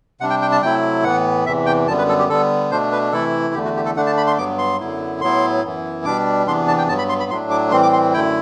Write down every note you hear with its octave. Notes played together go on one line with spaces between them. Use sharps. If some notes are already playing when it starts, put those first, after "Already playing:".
C3 G3 D4 F#5
G5
G5
A5
C3 F#3 A3 E4 G5
A2 E3 B3 F#5
E2 C3 E3 E5
G5
F#2 D3 G3 B3 A5
B4
A4
G4
D3 G3 B3 A4
B2 A3 D4 C5
B4
C3 E3 A3 E4 A4
E2 D3 A3 G4
F#4
G4
A4
D3 A3 D4 F#5
A5
B5
C6
G2 F#3 B3 D6
C6
F#2 D3 F#3 B3 E4
A2 F#3 B3 E4 C6
F#2 E3 B3 E4
B2 G3 D4 D6
E2 C3 E3 B3 D4 C6
A5
G5
G2 F#3 B3 A5
B5
C6
B5
A2 F#3 A3 D4 C6
D6
A2 E3 G3 C4 C6
D6
C6
F#2 D3 A3 E4 G5